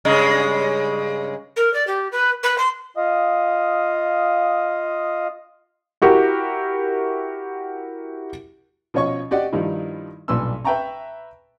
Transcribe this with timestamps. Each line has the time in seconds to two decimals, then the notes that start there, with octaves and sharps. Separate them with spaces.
0.05 G2 C#3 G#3
1.56 A#4
1.73 D5
1.87 G4
2.11 B4
2.43 B4
2.58 C6
2.97 F4 D#5 F5 D#6
6.02 E4 F#4 G4 A#4
8.94 B2 F3 C#4 C#5 D#5 C#6
9.31 F#4 G4 D5 D#5 F#5
9.53 G2 D#3 F3 G3 D#4 E4
10.28 B1 G2 A#2 B4 C6 E6
10.65 B4 E5 G5 A5 A#5 C#6